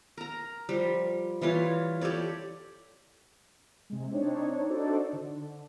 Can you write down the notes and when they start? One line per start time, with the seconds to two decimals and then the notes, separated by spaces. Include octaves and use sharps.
0.18 A#4 A#5
0.69 F3 G3
1.41 E3 G3 F4 C#5
2.01 G4 A4 C#5 D5
3.90 C3 G#3
4.11 C4 D4 D#4 C#5
4.69 D4 D#4 F#4 A4 C5 D5
5.13 D3